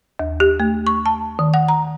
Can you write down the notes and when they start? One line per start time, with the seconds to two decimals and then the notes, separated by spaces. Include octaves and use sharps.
0.19 D#2
0.40 G4
0.60 A3
0.87 C#6
1.06 A5
1.39 D#3
1.54 F#5
1.68 A#5